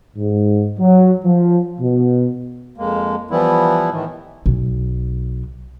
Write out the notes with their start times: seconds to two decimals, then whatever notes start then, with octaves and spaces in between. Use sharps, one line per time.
0.16 G#2
0.79 F#3
1.25 F3
1.80 B2
2.78 F2 G#3 A#3
3.31 E3 F3 G3 B3 E4
3.91 A2 D#3 E3
4.46 B1